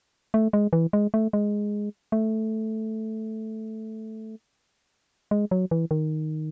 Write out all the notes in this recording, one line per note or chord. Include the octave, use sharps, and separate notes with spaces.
A3
G#3
E3
G#3
A3
G#3
A3
G#3
F#3
E3
D#3